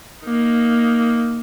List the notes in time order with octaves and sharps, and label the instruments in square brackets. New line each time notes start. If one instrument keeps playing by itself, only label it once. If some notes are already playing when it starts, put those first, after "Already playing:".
[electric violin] A#3 D#4